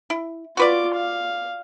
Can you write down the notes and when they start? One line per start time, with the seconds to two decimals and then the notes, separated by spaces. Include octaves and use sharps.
0.10 E4
0.57 F4 F#4 B4 D5 D6
0.94 F5